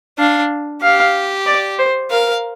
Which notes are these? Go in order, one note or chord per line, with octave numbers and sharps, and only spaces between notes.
D4 F5
G4 F5
D5
C5
A#4 F5